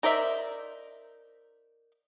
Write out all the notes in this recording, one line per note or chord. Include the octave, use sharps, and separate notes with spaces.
D#4 A#4 C5 D5 E5